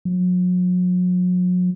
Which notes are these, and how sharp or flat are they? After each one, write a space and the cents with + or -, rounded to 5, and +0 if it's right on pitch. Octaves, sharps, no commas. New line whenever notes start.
F#3 -40